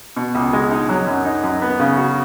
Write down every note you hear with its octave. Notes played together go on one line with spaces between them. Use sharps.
B2
C#2
G#3
D#4
F#3
F#2
D#4
F#2
B3
C#3
F#4